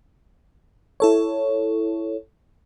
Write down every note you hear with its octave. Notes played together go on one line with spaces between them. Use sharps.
E4 A4 C#5